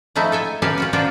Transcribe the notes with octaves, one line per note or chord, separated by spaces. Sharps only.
F3 A3 D#4 E4
A4 E5 G#5
C#4 G4 A#4 B4 F5 A5
C#4 F4 F#4
D4 F4 F#4 A#4 C5 D5